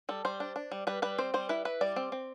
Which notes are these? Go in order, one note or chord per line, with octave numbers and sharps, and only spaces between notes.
G3 A4
G3 C5
D4
D4
G3
G3 B4
G3 B4
C4 C5
G3 C5
E4 B4
E4 B4
G3 D5
C4
C4